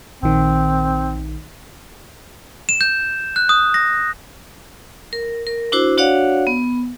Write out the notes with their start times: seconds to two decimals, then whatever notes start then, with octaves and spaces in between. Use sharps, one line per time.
0.22 A#1 D#3 C4
2.69 E7
2.81 G6
3.36 F#6
3.49 D#6
3.74 A#6
5.13 A#4
5.47 A#4
5.72 D4 E4 F#4 C5 D6
5.97 D4 F#4 C#5 D5 F5 F#5
6.47 B3